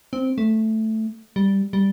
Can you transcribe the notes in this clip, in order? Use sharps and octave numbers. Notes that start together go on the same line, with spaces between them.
C4
A3
G3
G3